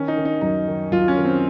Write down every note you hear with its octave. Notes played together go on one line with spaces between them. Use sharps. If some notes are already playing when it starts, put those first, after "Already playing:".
Already playing: D#3 C#4
D#4
D#3
D#4
F#2 D#4
D#3
F#2 F4
C#4
D#3
C4